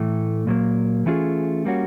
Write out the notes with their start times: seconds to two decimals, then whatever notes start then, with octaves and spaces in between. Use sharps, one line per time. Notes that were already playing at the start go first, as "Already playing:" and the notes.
Already playing: A2 E3 A3
0.47 A#2 F#3 A#3
1.06 E3 A3 C#4 F4 G#4
1.65 G3 A#3 C#4 F#4